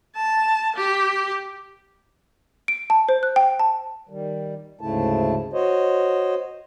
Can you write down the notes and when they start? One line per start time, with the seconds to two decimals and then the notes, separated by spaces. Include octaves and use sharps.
0.15 A5
0.76 G4
2.68 D7
2.90 A5
3.09 C5
3.23 F#6
3.36 G5
3.59 A5
4.09 D#3 G3
4.81 D2 G#2 C#3 A3 E4 A5
5.53 F#4 C5 C#5 D#5